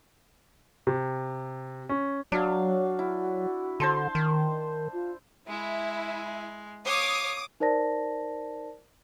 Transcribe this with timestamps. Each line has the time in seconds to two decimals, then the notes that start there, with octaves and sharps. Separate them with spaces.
0.87 C3
1.89 C#4
2.32 F#3 D4 F#4 F5
2.99 E4
3.80 D3 C5 A5 C6
4.15 D#3
4.93 F4
5.48 G#3 E4
6.85 C#5 F5 D6 D#6
7.60 D#4 A#4 C5 D5 A5 A#6